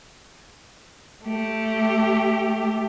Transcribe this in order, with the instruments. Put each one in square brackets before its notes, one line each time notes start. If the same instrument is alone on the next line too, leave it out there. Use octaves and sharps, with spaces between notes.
[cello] A3 G4